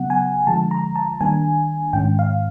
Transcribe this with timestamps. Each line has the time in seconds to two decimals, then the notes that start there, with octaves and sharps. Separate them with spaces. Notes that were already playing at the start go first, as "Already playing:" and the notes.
Already playing: C#3 F#3 B3 F#5
0.10 G#5
0.47 D3 F3 G#3 A5
0.71 A#5
0.96 A5
1.21 D#3 G3 A#3 D4 G#5
1.93 G#2 D#3 G#3 C#4 G5
2.19 F5